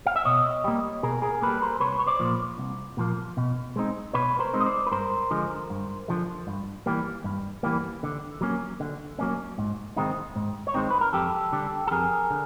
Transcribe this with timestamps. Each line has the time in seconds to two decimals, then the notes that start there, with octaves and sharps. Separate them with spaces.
0.06 F5
0.16 E5
0.25 B2 C#5 D#5
0.64 G3 A#3
1.03 B2 G#4 A#4
1.22 G#4 A#4
1.42 G3 A#3 A4 B4
1.62 A#4 C5
1.80 C2 B4 C#5
1.99 C#5
2.07 C5 D5
2.20 A#2 F3 A#3
2.58 C2
2.97 A#2 F3 A#3
3.37 B2
3.76 G#3 C4 D#4
4.13 B2 B4 C#5
4.39 A#4 C5
4.53 G#3 C4 D#4
4.60 D#5
4.66 C5 D5
4.87 B4
4.91 G2 A#4 C5
5.31 D3 F3 G#3
5.70 G2
6.08 D3 F3 G#3
6.47 G2
6.86 E3 G3 A#3
7.24 G2
7.63 E3 G3 A#3
8.03 D3
8.41 F#3 A#3 C#4
8.80 D3
9.19 F#3 A#3 C#4
9.58 G#2
9.97 D#3 G#3 C4 D#4
10.36 G#2
10.67 C#5
10.74 D#3 G#3 C4 D#4 C5
10.90 B4
11.01 A#4
11.13 F2 G4 A4
11.52 D3 G3
11.87 A4
11.91 F2 G#4 A#4
12.31 D3